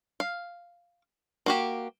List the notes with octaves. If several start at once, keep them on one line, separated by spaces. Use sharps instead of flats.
F5
A#3 F#4 G4